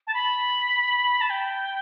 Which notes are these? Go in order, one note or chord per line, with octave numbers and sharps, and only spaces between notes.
A5
B5
A5
G5